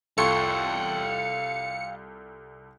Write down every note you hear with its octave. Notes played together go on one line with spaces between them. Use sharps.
C2 F4 A4 C#5 F5 G5 C6 C#7